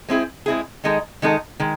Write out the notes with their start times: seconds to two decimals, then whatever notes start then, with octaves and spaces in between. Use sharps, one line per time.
0.09 G#3 C4 E4 G#4
0.46 G#3 C4 E4 G#4
0.84 D#3 G#3 D#4 A4
1.22 D#3 G#3 D#4 A4
1.60 D#3 G#3